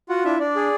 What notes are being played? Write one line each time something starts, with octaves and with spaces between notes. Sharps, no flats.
F4 F#4 F#5
D4 E4 E5
D4 D5
G#4